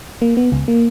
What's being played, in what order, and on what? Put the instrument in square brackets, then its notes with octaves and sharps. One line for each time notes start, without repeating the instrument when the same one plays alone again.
[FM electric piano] A#3
B3
C#2
A#3